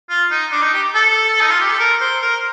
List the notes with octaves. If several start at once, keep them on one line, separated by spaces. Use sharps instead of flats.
F4
D#4
D4
D#4
G4
A4
D#4
F4
G4
A4
A#4
C5
A#4